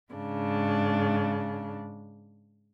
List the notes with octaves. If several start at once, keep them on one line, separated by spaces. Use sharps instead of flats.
G#2 C#3 D4